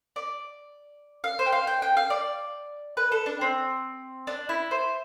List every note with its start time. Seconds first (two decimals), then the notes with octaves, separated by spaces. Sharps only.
0.16 D5
1.24 F5
1.39 C5
1.46 G5
1.52 F5
1.67 G5
1.82 G5
1.97 F5
2.10 D5
2.97 B4
3.12 A4
3.26 D4
3.41 C4
4.27 D4
4.49 E4
4.71 C5